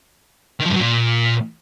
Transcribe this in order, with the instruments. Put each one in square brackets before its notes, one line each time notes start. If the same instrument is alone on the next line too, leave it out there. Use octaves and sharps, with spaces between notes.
[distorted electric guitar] D#3
F3
G2
F#3
A#2